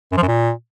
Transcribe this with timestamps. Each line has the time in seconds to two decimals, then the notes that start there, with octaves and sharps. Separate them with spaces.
0.12 F#2
0.17 F3
0.23 F#2
0.28 A#2